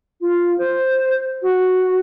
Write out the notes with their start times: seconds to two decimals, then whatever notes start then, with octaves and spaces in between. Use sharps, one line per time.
0.21 F4
0.58 C5
1.42 F#4